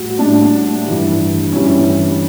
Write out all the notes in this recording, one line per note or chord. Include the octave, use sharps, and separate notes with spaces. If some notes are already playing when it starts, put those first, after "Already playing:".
Already playing: A2 G3 F#4
A2 G3 D4
G2 E3 G3
G2 E3 G3 C#4